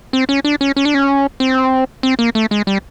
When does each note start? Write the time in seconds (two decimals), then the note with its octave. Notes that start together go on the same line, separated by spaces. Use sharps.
0.13 C4
0.29 C#4
0.44 D4
0.61 C#4
0.76 C#4
0.85 D4
0.94 C#4
1.40 C4
2.03 C4
2.19 A#3
2.35 A3
2.51 G#3
2.67 G3